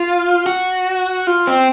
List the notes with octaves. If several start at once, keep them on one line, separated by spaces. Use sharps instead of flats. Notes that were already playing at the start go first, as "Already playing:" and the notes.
Already playing: F4
F#4
F4
C4